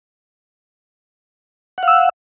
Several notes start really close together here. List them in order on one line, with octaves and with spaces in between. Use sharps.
F#5 F5 E6